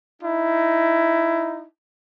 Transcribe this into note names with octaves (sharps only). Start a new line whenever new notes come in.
D#4 E4